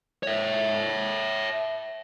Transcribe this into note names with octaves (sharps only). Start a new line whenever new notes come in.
C#5 E5